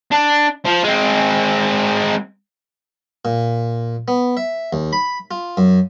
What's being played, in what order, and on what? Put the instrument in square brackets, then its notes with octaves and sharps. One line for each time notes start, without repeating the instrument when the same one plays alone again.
[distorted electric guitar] D4
F3
G#3 C4
[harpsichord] A#2
B3
E5
D#2
B5
F4
F#2